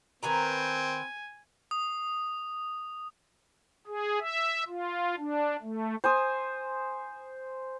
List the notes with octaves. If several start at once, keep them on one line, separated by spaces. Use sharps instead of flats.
D#3 C4 B4 G#5 A#5
D#6
G#4
E5
F4
D4
A3
C5 G#5 D#6